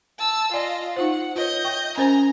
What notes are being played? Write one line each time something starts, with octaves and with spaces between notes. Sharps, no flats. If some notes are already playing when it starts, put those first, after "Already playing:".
A5 E6
F4 D5 D#5 G#5
D#4 F4 C5 F#5
F4 B4 C#5 D#5 G6
E5 G5 C#6
C#4 A#4 C5 G#5 A#5